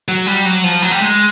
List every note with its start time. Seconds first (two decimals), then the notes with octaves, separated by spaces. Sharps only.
0.08 F#3
0.27 G3
0.45 F#3
0.64 F3
0.82 F#3
0.91 G3
1.01 G#3